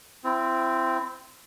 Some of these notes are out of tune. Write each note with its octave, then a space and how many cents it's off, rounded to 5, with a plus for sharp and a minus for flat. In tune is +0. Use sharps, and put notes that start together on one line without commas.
C4 -5 E4 +30